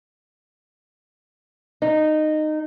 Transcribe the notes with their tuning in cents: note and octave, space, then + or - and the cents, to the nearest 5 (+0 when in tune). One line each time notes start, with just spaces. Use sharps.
D#4 -15